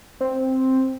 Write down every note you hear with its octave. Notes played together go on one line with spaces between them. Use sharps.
C4